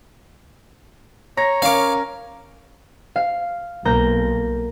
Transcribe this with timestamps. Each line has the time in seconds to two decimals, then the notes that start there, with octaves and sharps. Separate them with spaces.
1.37 C#5 A#5 A#6
1.62 C#4 A#4 F5 D6
3.16 F5
3.85 B1 A#3 A#5 G6